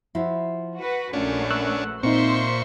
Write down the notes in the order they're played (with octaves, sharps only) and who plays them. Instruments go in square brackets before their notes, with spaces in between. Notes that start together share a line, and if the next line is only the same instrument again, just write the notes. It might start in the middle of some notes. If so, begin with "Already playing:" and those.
[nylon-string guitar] F3 E4 F#4
[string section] F#4 B4
[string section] A#1 F#2 A3 [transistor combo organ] C#4 D4 [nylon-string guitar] F4
[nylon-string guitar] B4 [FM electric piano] C#6 E6 F#6
[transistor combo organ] A#2 C#6 [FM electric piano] C4 D#4 [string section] C5 E5 C6